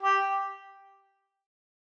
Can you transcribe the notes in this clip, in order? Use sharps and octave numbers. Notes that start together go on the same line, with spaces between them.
G4